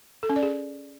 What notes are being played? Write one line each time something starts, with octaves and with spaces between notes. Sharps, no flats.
A4
C#4
D5
G#4